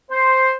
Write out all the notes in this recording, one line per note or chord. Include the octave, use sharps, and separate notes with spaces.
C5